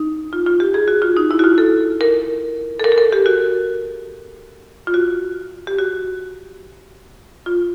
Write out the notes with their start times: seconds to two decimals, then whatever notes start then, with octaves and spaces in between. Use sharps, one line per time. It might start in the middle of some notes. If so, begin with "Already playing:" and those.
Already playing: D#4
0.33 F4
0.46 F4
0.60 G4
0.74 G#4
0.88 F#4
1.02 F4
1.17 D#4
1.31 E4
1.39 F#4
1.44 F4
1.58 A4
2.01 A#4
2.80 A4
2.84 A#4
2.92 A4
2.98 A#4
3.13 G4
3.26 F#4
4.87 F4
4.94 F#4
5.67 G4
5.79 F#4
7.46 F4